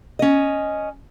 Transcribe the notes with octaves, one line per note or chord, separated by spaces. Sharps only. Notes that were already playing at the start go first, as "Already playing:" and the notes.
C#4 D#5